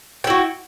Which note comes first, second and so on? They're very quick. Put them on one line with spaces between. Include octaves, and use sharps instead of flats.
G5 E4 F#4